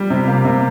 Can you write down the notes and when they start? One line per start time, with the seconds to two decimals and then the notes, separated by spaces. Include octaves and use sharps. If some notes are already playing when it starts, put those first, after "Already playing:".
Already playing: G3
0.10 C3
0.28 A#3
0.45 C3